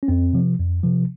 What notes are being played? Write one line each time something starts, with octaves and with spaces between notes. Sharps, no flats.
C#4
F2 C4
C3 F3
F2
C3 F3